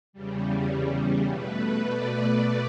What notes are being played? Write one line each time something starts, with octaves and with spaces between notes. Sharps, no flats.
E2 C#3 G3
B2 A3 B4
D5